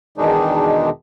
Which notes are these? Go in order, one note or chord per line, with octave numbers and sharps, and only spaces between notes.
E2 B2 D#3 G#3 D4 D#4